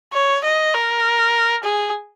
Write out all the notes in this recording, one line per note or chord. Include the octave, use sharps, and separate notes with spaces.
C#5
D#5
A#4
G#4